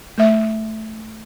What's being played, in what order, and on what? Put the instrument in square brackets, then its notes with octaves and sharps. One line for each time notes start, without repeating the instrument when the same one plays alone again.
[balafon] A3 E5